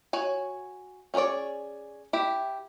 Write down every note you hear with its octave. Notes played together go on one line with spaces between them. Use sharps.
F#4 C#5 G#5
C#4 G#4 A#4 C#5 D5
E4 G4